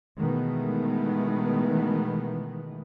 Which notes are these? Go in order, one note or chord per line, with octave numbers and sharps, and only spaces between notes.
B2 D#3 E3 G#3 A3 B3